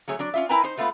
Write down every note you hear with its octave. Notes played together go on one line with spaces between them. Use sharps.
F#3 A3 G#4 C#5
F#3 D4 D5
C#4 F4 E5
E4 A#4 B4 G5 G#5 A#5
D#4 C5
G#3 A3 B3 D#4 F4 B4